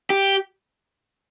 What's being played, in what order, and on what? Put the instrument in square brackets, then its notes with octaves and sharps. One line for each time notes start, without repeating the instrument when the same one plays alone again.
[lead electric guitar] G4